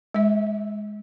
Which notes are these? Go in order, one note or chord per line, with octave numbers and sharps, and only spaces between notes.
G#3 E5